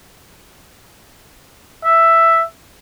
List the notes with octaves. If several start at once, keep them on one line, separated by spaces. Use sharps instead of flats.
E5